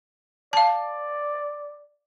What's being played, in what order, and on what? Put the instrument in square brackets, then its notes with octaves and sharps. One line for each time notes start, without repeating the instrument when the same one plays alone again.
[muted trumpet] D5 [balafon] F5 A5